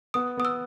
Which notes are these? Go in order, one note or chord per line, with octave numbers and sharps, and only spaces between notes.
B3 D#6
B3 D#6
E6